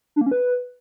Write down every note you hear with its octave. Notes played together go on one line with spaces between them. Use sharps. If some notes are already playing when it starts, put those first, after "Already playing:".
D4
A#3
C#4
B4